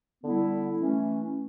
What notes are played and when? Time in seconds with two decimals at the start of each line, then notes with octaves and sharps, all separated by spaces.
0.24 D3 G3 B3 E4
0.80 E3 A3 C#4